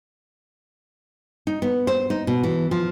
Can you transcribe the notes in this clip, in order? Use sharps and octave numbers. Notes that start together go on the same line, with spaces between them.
D#4
B3
C5
D#4
B2
E3
F3